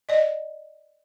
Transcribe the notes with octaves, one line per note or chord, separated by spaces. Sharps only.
D5 D#5